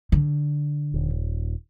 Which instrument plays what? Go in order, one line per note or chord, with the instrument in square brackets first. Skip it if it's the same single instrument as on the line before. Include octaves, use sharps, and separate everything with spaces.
[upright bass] D3
[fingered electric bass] D#1